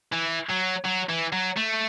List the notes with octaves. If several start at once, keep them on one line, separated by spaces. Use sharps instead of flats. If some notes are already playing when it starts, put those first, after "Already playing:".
E3
F#3
F#3
E3
F#3
A3